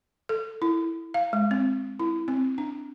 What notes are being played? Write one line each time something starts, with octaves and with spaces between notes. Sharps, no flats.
A4
E4
F5
G#3
C4
E4
C4
D4